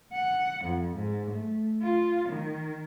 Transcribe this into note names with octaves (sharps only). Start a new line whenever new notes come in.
F#5
F2
G#2
A3
F4
D#3